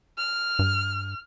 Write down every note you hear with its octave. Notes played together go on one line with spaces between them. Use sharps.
F6
G2